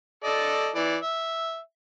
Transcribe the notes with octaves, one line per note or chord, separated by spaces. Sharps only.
A4 D5 D#5
E3 D5
E5